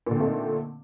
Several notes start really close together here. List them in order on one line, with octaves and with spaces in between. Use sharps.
A#2 D3 C4 A3 D#4